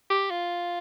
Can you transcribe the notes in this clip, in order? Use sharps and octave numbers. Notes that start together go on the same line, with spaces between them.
G4
F4